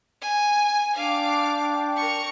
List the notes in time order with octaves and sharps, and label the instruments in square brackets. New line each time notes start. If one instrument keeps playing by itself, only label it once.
[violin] G#5
[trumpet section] D4 G5 [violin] F5 D6
[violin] A#4 C#6